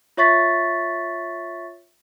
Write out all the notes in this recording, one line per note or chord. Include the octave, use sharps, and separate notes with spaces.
F4 C#5 E5 C#6 A6 B6